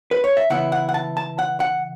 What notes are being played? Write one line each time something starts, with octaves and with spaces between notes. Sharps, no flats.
B4
C#5
E5
C#3 E3 B3 E4 F#5
F#5
F#5
A5
A5
F#5
F#5